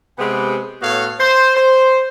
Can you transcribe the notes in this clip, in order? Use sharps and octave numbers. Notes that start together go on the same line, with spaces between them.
C3 G#3 B3 G4 B4 G5
A2 B3 F#4 A4 C#5 F5
C5
C5